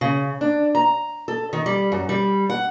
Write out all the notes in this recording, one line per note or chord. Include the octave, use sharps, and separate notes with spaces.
C#3
D4
A#5
A4
D#3
G3
F#2
G3
F#5